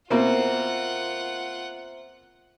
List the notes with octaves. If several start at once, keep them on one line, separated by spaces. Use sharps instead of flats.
B2 A#3 C4 F4 C5 E5 F#5 A#5